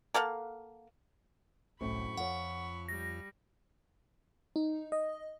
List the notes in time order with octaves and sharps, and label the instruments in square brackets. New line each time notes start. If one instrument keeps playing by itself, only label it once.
[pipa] A#3 A4 F5 F#5
[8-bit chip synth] G1 C2 [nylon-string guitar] F#2 A2 C4 [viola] B5 C#6
[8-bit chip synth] F2 [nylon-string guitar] F3 C#5 [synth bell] F#5
[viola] G3 [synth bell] A#6
[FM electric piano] D#4
D#5